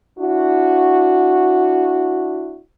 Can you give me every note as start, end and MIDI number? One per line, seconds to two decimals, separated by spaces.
0.19 2.60 62
0.19 2.60 64
0.19 2.60 66